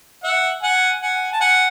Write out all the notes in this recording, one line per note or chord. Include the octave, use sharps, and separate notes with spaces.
E5 F#5
F#5 G#5
F#5 G#5
A5
F#5 G#5